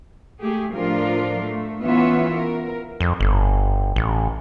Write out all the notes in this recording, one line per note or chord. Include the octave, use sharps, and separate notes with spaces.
A3 G4 G#4
A2 F3 D4 F4 A#4
A3
E3 B3 C#4 F4 B4 E5
A#4
F2
G1
A1